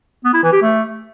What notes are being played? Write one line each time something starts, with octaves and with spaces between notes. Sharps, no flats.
B3
E4
E3
G4
A3